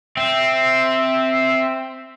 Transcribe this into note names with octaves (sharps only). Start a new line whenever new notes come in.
C4 E5